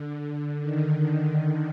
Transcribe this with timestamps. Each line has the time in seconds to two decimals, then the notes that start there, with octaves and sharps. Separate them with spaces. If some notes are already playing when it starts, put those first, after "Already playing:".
Already playing: D3
0.60 D#3